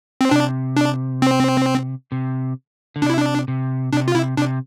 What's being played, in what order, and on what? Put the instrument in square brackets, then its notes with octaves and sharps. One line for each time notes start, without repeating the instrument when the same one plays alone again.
[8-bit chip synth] C4
[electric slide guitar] C3 [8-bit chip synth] D4
[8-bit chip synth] D4
C4
[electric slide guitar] C3
D3
[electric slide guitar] C3 [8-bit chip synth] D4
[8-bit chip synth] E4
D4
[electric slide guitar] C3
[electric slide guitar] C3 [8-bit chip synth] D4
[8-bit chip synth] F4
[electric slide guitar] C3 [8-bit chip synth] E4
[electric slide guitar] C3 [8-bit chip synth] D4